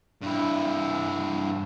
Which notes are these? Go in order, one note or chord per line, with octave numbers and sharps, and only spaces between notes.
G2 E4